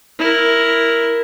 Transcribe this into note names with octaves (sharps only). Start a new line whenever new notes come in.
E4 A#4